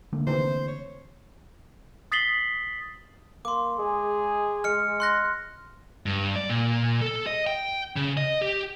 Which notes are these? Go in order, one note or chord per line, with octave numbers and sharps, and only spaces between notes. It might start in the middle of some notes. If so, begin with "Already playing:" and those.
D3 A3 A#3
C3 D#3 E3 C5
C#5
D#6 A6 B6 C7 F#7 G7
A#3 C6 D6
G#3 G#4
G#3 F6 C#7
C6 F#6 A#6
G2
D5
A#2
A4
D#5
G5
C#3
D#5
G4